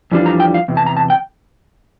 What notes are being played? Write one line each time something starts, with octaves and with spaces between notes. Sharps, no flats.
F2 E3 G3 D4 F4
A#5
G5
F5
E2 C3
A5
A#5
A5
G5